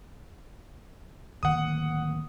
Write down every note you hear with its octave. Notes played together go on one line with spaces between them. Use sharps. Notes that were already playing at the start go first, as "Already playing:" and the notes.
D1 D#3 A#3 F#5 D#6